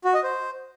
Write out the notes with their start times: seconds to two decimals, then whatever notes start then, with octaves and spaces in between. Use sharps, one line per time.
0.05 F#4
0.14 D#5
0.23 C5